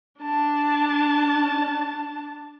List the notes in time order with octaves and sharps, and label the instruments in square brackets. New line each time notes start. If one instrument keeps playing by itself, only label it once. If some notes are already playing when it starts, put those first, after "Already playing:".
[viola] D4 A5